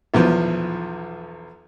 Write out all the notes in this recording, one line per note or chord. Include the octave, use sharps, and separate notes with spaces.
B1 E2 F3